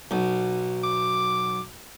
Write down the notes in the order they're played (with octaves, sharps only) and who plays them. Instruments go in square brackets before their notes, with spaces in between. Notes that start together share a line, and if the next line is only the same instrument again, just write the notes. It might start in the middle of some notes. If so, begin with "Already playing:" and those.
[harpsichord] B1
[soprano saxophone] D6